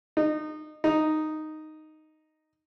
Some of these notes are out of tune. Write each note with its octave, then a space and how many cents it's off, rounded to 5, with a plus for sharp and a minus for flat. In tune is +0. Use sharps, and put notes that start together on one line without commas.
D#4 -25
D#4 -5